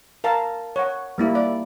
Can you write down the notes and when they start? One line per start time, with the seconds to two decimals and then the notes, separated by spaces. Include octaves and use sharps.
0.24 A#4 F5 A5 A#5
0.76 C#5 F#5
1.18 G3 A#3 E4
1.35 D5